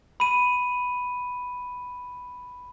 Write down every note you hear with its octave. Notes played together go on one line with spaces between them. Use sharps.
B5 D#7